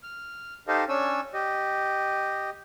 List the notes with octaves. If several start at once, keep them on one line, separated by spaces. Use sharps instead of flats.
F6
D#4 G4 A4 C5 D#5 F5
C#4 D4 C#5 G#5 E6
G4 D#5